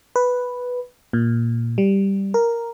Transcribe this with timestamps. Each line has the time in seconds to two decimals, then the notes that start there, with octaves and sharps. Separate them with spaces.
0.16 B4
1.13 A#2
1.78 G3
2.34 A#4